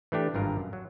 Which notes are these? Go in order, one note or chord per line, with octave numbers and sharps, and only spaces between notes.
E3 A3 D4 G4
G#1 G2 F4 A#4
F#2
F#3